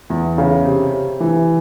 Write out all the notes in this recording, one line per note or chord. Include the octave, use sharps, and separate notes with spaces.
E2
C#3
C3
C3
E3